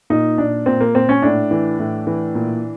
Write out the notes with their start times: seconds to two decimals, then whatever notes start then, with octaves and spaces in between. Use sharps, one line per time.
0.10 A#2 D#4
0.38 A#2 D4
0.66 A#2 C4
0.81 A#3
0.95 A#2 C4
1.09 C#4
1.22 A2 D4
1.51 E3
1.79 A2
2.07 E3
2.35 A#2